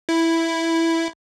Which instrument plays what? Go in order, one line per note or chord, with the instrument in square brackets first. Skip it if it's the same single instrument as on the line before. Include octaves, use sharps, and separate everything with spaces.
[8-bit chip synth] E4